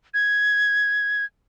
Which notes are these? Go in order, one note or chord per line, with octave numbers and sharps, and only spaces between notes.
G#6